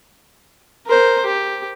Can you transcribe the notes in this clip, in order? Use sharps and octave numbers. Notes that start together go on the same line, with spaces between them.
A#4 C5
G4